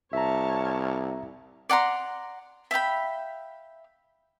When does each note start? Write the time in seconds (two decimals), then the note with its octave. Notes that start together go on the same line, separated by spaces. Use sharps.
0.13 C2 C#5 E5 A5 A#5 F6
1.70 D5 F#5 A#5 C6
2.71 E5 F5 G5 B5